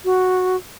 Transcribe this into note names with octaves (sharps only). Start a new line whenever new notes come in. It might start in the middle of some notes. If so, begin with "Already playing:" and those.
F#4